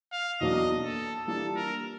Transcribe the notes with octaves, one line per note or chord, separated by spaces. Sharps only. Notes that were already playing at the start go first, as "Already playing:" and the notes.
F5
E2 B2 F#3 A#3 D4 D#5
A4
E3 G3 A#3 D4 F4 A4
A#4